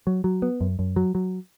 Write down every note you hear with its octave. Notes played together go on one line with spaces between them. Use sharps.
F#3
F#3
B3
F#2
F#2
F#3
F#3